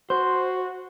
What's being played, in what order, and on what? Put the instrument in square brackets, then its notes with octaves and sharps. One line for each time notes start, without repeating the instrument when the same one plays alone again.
[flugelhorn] F#4 [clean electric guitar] C5